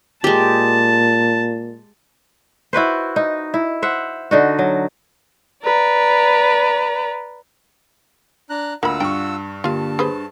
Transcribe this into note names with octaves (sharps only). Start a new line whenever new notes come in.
A#2 G#3 G4 A5
E4 F#4 B4 C5
D#4
E4
C5 E5 F#5
D3 D#4 F#4
F#3
B4 D5 A#5
D4 A#5 F#6
D2 A#3 F4 F#5 B5 E6
G2 G5 C#6
D3 A#3 F4 G4 F5 A5
G#4 B4 C5